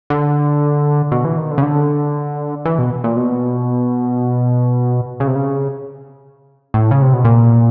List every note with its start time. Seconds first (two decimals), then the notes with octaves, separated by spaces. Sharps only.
0.10 D3
1.12 B2
1.25 E3
1.38 D#3
1.51 D3
1.58 C#3
1.63 D3
2.65 E3
2.79 B2
3.04 A#2
3.17 B2
5.20 C#3
5.27 C3
5.35 C#3
6.74 A2
6.91 C#3
7.02 C3
7.13 B2
7.25 A#2